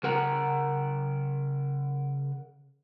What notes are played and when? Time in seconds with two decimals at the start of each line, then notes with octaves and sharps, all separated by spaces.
0.03 C#3 A#4 F#5 A#5